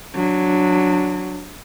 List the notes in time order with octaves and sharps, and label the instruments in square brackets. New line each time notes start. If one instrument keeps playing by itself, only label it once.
[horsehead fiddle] F#3 D4